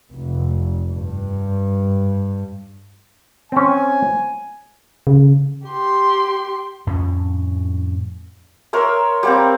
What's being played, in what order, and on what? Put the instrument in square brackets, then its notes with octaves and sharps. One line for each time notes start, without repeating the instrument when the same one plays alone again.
[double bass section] F1
G2
[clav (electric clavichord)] C4 C#4 [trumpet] G#5
[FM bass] C#3
[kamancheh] G4 C6
[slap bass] F2 A2 C#4
[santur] A#4 C#5 E5 C6
G3 A#3 C4